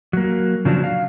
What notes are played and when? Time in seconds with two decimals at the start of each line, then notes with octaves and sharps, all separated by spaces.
0.13 F#3 A#3
0.65 C#3 F3 F#3 D4
0.84 F5